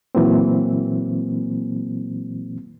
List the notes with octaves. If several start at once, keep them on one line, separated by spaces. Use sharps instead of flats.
A#2 E3 F#3 A#3 C4